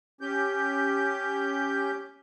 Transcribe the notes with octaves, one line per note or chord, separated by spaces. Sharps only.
C#4 G4 G6